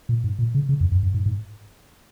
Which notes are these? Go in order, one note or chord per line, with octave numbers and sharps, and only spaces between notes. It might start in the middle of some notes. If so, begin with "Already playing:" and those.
A#2
G#2
A#2
C#3
C#3
F2
F#2
F#2
G#2
G#2